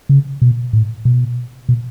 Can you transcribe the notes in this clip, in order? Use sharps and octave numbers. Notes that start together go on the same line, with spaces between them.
C#3
B2
A2
B2
B2